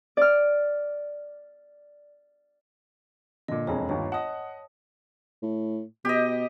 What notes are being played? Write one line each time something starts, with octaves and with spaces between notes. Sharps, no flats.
D5 F6
A#2 D3 D#5
E1 F2 G#4 C#5
G1 D#2 F4 C#5
D#5 F#5 A5 D#6
A2
B2 G4 D#5